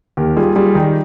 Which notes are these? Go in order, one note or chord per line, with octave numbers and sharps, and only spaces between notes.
D#2 G4 A#4
G3 F4 G#4
G3 F4 G#4
D#3 D#4 G4